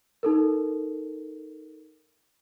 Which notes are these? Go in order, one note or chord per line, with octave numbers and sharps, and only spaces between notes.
D#4 A4 A#4